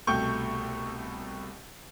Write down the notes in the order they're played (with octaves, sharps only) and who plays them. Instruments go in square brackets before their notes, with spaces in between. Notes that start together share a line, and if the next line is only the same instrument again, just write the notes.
[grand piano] C2 B2 A3 G5 C#6 G6